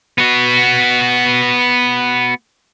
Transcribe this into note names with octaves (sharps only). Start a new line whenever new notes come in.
B3 F#4